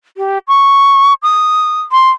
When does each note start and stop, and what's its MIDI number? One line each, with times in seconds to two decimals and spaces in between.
0.17 0.38 67
0.48 1.13 85
1.22 1.82 87
1.92 2.10 84